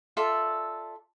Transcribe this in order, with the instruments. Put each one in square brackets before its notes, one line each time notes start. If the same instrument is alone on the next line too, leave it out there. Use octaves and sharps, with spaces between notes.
[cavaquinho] F4 A4 D5 E5